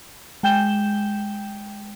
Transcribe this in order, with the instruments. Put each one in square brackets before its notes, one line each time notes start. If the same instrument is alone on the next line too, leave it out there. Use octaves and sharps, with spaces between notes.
[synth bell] G#3 G5 G6 E7 G7